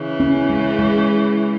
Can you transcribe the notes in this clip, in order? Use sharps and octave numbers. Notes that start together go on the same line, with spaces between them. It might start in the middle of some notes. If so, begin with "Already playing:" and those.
Already playing: C#3 E3
C#4
G#3
G#3